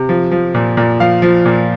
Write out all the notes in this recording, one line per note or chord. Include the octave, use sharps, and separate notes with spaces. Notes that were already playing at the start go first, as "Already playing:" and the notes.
Already playing: C3
F3
F3
A#2
A#2
F3 F5
F3
A#2